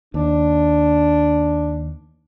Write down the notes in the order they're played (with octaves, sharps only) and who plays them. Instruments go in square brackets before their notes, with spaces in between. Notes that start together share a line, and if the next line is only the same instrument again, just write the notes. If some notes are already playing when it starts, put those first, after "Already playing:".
[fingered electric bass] D#2 [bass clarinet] D4